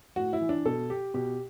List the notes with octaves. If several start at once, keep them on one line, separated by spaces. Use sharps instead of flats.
A2 F#4
E4
E3
D4
B2 A4
G4
B2 G4